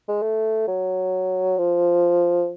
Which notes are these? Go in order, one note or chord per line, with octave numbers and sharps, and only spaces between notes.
G#3
A3
F#3
F3